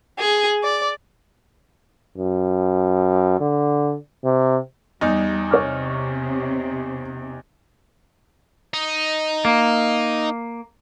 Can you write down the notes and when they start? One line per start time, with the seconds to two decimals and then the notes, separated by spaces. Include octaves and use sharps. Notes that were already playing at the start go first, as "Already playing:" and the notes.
0.18 G#4
0.63 D5
2.18 F#2
3.40 D3
4.24 C3
5.01 E2 G3 D#4
5.51 C3 C#5 D6 F6
8.74 D#4
9.45 A#3